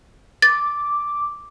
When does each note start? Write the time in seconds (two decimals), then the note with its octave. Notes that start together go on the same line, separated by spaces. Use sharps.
0.42 D6 A6